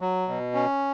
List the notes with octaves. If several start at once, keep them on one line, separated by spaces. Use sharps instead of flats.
F#3
B2
C#4